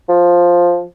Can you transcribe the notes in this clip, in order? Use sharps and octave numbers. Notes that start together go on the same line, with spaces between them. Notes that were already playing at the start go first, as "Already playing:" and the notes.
F3